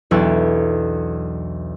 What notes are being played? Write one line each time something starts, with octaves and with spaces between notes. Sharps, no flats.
B1 E2 D4 A4 E6